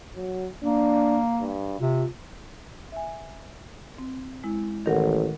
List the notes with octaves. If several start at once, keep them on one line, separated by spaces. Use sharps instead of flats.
F#3
A#3 D4
G2
C3 F4
E5 G#5
C4
G#3 E4
A1 D#3 A#4 F#5